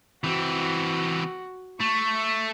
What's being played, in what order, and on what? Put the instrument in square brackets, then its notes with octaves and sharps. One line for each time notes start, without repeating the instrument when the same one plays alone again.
[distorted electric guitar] E3 C4 [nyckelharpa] F#4
[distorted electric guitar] A3 [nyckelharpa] C#6